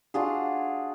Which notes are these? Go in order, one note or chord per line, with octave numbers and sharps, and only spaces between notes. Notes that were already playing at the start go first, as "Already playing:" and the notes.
D4 F4 F#4 G#4